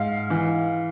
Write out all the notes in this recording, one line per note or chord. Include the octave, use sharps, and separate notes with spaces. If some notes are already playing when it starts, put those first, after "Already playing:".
Already playing: G#2 F5
E3